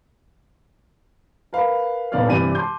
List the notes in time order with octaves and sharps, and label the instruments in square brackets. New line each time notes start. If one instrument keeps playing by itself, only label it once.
[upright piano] A#4 B4 F5 B5
D#1 B3 D5 F5 F6
G2 C3 E3 G4 D5 D#7
A5 C6 D6 G6